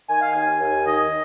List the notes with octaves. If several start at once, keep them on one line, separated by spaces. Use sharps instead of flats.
D#3 G#5
F5
D#2 G#5
D#2
D#3 D#5